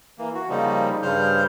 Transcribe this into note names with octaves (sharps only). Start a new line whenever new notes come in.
E3 A#3
F#4
C#3 F3 G3 A#3 D#4
G2 C#3 G3 C5 F6 G6